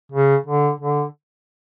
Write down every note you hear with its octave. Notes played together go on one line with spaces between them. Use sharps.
C#3
D3
D3